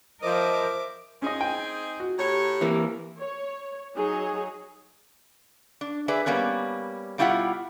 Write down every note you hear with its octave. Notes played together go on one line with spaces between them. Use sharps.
F3 A#4 C5 D#5 E5 D6
C4 C#4 D#4 G#4 D#5
G5 G#5
F#4
A2 G4 C#5 A#5
E3 A#3
C#5
F#3 D#4 G#4 C#5
D4
G#4 B4 D5 E5
G3 A#3 B3 C#4
B2 G3 E4 F4 G4 F#5